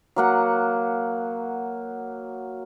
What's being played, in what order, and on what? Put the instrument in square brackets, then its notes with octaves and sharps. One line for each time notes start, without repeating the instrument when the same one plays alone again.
[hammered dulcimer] F#3 A#3 F#5